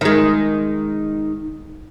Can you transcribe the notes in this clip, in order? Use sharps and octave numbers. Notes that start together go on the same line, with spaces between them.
D#3 G#3